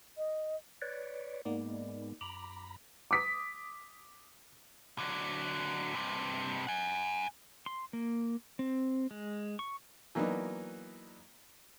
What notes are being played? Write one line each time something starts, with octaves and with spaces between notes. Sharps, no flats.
D#5
B4 C#5 D5
G#2 G#3 A#3 B3 D#4 D5
F#2 A#5 B5 D6
D6 D#6 B6
D3 F#3
G2 C3
F#5 G#5
C6
A#3
C4
G#3
C#6
E3 F#3 A#3 B3 D4 D#4